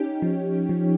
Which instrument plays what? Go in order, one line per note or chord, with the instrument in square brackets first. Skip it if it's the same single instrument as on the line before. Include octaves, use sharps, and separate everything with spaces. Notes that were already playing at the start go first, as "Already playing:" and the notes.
Already playing: [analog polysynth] C#4 G4 [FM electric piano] D#4
[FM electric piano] F3
F3